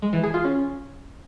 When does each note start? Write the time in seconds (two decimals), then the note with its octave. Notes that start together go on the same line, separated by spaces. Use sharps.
0.02 G#3
0.13 E3
0.23 G#4
0.34 F4
0.44 C#4